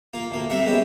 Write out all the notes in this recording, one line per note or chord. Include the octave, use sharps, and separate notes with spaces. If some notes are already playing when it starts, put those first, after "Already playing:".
A#3 F4
D2 A2 A#3
G3 A3 C4 A#4 E5 F#5
G#3 B3 C#4 E4 G4